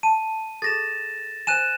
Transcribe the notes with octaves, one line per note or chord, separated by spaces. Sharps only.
A5 D#7
G#4 A4 A6 A#6 E7
C5 E5 G#5 F#6 D#7 E7